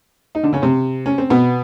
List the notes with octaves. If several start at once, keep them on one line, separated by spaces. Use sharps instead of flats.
D#4
D3 D4
C#3 C#4
C3 C4
C#4
C4
B2 B3